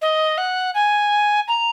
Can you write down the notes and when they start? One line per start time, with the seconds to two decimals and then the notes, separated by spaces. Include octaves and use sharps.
0.02 D#5
0.38 F#5
0.74 G#5
1.48 A#5